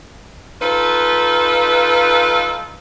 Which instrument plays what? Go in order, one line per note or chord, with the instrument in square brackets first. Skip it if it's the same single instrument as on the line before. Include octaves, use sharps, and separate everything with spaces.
[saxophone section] D#4 F4 A4 B4